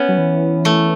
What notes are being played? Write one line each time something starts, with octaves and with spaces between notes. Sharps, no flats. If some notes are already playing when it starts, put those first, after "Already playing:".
Already playing: B3 C#4
F#3
E3
A3